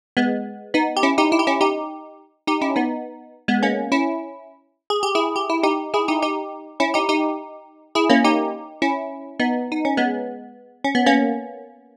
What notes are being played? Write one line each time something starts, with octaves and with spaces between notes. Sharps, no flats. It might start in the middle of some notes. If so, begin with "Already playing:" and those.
G#3 B3
B3 D#4
G4
C#4 E4
D#4 G4
E4
G4
C#4 E4
D#4 G4
D#4 G4
C#4 E4
B3 D#4
G#3 B3
A#3 C#4
C#4 E4
G#4
G4
E4 G#4
G4
E4
D#4 G4
E4 G#4
D#4 G4
D#4 G4
C#4 E4
D#4 G4
D#4 G4
E4 G#4
A#3 C#4
D#4 G4
C#4 E4
B3 D#4
D#4
C#4
G#3 B3
C#4
B3
A#3 C#4